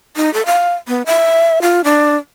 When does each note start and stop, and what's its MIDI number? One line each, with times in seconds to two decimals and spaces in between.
0.16 0.32 63
0.34 0.45 69
0.46 0.73 77
0.88 1.02 59
1.06 1.62 76
1.62 1.81 65
1.84 2.16 62